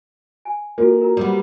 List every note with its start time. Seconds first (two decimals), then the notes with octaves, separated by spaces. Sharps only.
0.45 G#5
0.78 A#3 F4 F#4 A4
1.01 A#4 A#5
1.17 G3 B3